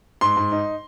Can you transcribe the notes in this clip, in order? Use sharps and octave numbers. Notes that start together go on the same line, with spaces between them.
G#2 C6
G#2
D#4